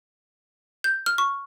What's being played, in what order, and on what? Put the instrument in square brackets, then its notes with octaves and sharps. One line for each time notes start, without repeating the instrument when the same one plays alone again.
[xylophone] G6
F6
C#6